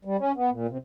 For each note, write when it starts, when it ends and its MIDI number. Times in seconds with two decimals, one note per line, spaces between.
0.05 0.17 55
0.19 0.32 61
0.36 0.50 59
0.51 0.67 46
0.69 0.78 48